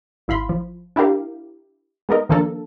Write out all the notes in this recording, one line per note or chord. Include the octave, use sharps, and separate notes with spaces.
G#1 E4 F5 B5 C6
F3
D4 E4 F4 G4 A#4 F5
G#3 B3 D#4 A#4 D#5
D#3 F3 A#3 D4 A4 A#4